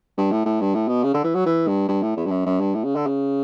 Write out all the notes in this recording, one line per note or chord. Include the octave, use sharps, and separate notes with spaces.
G2
A2
A2
G2
A2
B2
C#3
D3
E3
F#3
E3
G2
G2
A2
E2
G2
F#2
F#2
G2
A2
C#3
D3
C#3